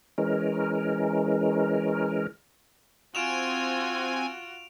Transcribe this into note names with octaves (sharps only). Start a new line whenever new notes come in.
E3 G#3 C#4 A#4
C4 F4 F#4 G#5 D7 E7 F7